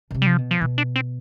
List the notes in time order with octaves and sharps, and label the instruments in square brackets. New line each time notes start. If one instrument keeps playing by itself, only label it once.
[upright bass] D3
C3
[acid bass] G3
F3
[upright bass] B2
[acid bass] F3
[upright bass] B2 [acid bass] E3
[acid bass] D4
C4